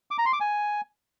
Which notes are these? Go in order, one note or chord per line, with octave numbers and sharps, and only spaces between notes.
D6
A#5
C6
D6
G#5